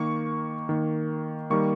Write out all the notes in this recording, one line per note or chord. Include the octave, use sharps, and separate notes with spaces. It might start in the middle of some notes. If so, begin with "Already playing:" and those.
Already playing: D#3 A#3 C#6
D#3 A#3
D#3 G3 A#3 C#6